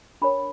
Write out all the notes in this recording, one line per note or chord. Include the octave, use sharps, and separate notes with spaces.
D4 A#4 C#5 B5